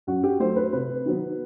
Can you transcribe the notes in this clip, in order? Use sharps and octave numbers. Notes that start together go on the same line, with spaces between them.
F#2 F#4
G4
F#3 A3 C5
B4
C3 B4
D#3 F#3 B3